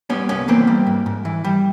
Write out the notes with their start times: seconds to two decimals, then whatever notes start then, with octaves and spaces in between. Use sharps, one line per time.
0.10 G3 B3 C#4
0.29 C2 B3 C#4
0.48 E3 A#3 C4
0.67 G3
0.87 G#2
1.06 G#2
1.25 E3
1.44 G3